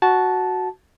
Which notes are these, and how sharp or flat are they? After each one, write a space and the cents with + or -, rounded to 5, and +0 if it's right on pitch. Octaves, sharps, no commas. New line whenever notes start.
F#4 +0 A5 -15